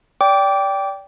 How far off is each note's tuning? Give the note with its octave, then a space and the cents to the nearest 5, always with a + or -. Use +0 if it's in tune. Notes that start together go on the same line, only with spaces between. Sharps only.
D5 -25 G5 +0 D6 -20